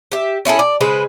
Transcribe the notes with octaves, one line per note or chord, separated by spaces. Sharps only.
G4 E5
C#4 E4 G#4 A4
D5
C#3 G#3 B4 C5